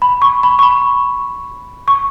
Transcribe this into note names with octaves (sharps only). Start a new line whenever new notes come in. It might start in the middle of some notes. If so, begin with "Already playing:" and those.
B5
C#6
B5
C#6
B5
C#6